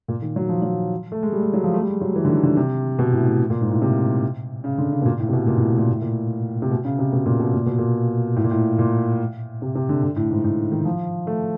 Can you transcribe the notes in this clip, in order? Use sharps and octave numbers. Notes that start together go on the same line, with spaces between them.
A#2
D#3
F#3
F3
F#3
A3
G#3
G3
G#3
F#3
F3
A3
G3
G#3
F#3
E3
D3
D#3
D3
C3
B2
A2
A2
A#2
G#2
A2
C3
C#3
D3
C#3
B2
A#2
A2
C3
B2
A#2
A2
A#2
A2
A#2
C3
B2
C#3
C3
B2
A#2
B2
A#2
B2
A#2
A2
A#2
A2
A#2
C3
C3
D3
D3
A2
G#2
A2
D#3
F3
A3